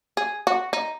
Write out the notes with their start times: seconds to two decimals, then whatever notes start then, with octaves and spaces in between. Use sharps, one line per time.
0.17 G#4
0.47 F#4
0.73 D#4